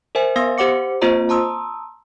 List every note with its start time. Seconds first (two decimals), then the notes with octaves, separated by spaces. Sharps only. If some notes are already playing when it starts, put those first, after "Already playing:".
0.15 A#4 C5 E5 G#5
0.36 B3 F5 C6 D#6 A#6
0.58 G4 C5 F#5 D6 C#7
1.02 A#3 C4 F4 C5 D#5 A#5
1.29 A5 A#5 C6 D#6 E6